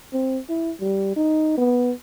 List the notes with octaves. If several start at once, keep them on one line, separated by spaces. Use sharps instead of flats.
C4
E4
G3
D#4
B3